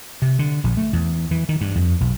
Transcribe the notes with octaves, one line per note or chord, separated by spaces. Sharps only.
C3
D3
A#1
A3
E2
E3
D#3
G2
F2
B1